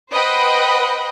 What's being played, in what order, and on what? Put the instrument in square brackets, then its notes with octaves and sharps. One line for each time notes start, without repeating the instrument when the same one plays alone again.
[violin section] B4 C5 D#5 F#5 G5 B5